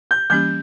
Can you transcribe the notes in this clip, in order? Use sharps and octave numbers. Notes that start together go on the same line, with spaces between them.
G6
E3 G3 A#3 C#4 G4 G6